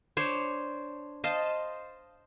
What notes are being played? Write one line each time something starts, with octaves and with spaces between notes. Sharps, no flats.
D4 C5 C#5
C5 D#5 F5 A5